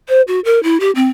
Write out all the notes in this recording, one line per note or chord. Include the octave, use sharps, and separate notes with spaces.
C5
F#4
A#4
E4
G4
C4